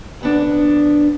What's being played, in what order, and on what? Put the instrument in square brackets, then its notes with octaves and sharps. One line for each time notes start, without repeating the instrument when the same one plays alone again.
[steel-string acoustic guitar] D2 B3 D4